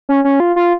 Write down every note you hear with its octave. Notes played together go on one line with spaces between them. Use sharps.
C#4
C#4
F4
F4